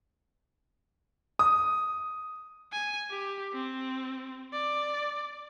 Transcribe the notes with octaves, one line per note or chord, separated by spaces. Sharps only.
D#6
G#5
G4
C4
D5